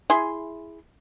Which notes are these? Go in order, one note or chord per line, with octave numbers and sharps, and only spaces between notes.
E4 G#4 C6